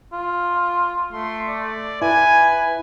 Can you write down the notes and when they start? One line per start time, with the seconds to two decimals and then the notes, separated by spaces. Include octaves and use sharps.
0.12 F4
1.12 A3 C6
1.48 D5
2.02 E4 B4 G#5